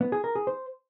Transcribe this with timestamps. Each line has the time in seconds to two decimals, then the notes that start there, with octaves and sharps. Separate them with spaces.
0.01 B3
0.12 G#4
0.24 A#4
0.35 G#4
0.47 C5